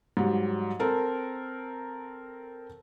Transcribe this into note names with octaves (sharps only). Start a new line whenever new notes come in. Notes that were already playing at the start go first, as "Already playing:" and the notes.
G#2 F#3 G3
C4 A4 A#4 A5